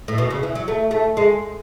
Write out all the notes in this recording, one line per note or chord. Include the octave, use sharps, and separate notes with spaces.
A2
B2
C#3
E3
F#3
A3
A3
G#3